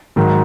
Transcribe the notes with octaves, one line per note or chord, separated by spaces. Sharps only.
G#2 D#3 F#3